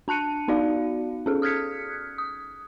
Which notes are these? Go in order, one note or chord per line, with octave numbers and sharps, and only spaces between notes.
D4 A5 F#6 C#7 D#7
B3 D#4 F#4 D5 F5
C#4 G#4 A4
D#6 F6 F#6 G#6 B6 C#7
D#6